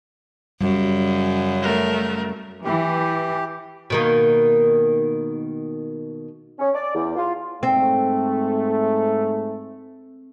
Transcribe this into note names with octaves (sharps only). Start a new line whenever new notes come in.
F#2 C#3 G3
A3 A#4
E3 G4
B2 D#3 A#3
C#4
D5
E2
F4
G#2 A3 C4